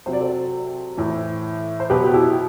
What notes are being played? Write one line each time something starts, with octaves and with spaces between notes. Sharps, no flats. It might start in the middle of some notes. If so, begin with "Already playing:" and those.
C3 F#3 C5
D5
A4 C5
A2 E3
C5
B2 F#3 G4 B4
E4 G4